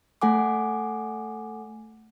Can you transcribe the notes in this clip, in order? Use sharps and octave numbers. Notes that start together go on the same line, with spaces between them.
A3 A4 F#5 G#5 D6